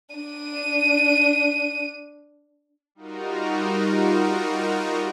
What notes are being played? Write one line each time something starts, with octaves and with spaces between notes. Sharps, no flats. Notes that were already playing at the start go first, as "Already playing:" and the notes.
D4 D#7
G3 D#4 F4 F#4 A#4